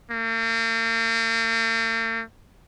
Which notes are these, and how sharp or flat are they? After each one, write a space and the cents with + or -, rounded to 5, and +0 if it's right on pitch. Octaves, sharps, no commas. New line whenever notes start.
A#3 -45